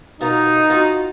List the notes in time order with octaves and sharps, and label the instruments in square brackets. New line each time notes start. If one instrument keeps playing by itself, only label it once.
[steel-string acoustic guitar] B2 F4 A#4 [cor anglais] D#4
[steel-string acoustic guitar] F4 F#4 F5